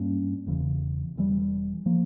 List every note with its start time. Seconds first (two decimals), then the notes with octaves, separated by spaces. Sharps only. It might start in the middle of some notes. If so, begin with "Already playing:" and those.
Already playing: G2 G3 A#3 C#4
0.46 E1 E2 C#3 E3
1.16 E1 E2 E3 G3
1.86 F3 A#3